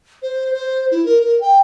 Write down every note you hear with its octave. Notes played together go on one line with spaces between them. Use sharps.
C5
C5
E4
A#4
A#4
G5